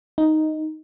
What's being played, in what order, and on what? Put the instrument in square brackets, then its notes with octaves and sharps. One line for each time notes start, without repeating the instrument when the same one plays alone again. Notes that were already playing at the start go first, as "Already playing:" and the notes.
[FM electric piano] D#4